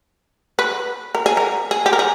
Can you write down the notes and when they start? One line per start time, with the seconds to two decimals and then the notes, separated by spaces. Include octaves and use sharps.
0.59 B4
1.15 A#4
1.26 G#4
1.37 A#4
1.71 G#4
1.86 G4
1.93 A#4
1.99 G#4